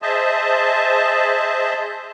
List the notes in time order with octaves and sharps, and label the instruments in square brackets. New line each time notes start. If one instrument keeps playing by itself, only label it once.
[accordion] G#4 C5 D#5 E5 A5